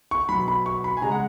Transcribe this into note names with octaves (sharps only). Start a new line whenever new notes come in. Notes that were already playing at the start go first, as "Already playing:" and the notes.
C#6
B2 F#3 B5
B5
C#6
B5
G#5
C#3 G#3 A#5
F#5